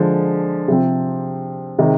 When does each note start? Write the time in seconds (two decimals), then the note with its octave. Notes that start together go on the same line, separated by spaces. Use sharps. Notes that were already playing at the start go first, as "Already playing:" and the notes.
Already playing: D3 F3 G#3
0.68 C3 F3 C4
1.79 C3 D#3 G#3